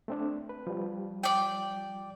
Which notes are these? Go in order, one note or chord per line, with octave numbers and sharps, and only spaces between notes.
A3 C4 D4
B4
F3 G3
D5 G5